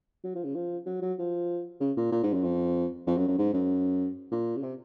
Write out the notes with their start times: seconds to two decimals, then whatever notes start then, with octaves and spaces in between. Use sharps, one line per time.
0.24 F#3
0.35 F3
0.44 C#3
0.55 F3
0.86 F#3
1.02 F#3
1.19 F3
1.80 C#3
1.97 A#2
2.12 A#2
2.23 G#2
2.34 F#2
2.44 F2
3.07 F2
3.17 F#2
3.28 F#2
3.38 G#2
3.54 F#2
4.32 A#2
4.57 C#3
4.63 C3